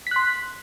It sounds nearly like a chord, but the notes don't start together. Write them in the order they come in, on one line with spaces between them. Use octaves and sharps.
B6 F#6 C6